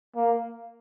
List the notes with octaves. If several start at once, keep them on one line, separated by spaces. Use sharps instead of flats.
A#3